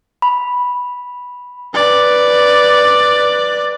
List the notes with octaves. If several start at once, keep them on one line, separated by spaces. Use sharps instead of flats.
B5
B4 D5